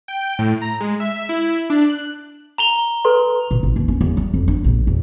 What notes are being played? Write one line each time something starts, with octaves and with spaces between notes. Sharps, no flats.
G5
A2
A#5
G#3
E5
E4
D4
F#6
A#5 F7 G7
A4 B4 C6
A#2
A1
D#2
C#4
E2
G3
F2
D4
A#1
E2